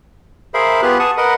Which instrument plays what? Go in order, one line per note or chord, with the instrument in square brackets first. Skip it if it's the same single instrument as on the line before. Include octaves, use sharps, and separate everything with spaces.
[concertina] G#4 A#4 C5 E5 F5 B5
B3 F4 G4 G#4 B4 F#6
G#4 F#5 A5 C#6 D#6
A#4 B4 D#5 F#5 B5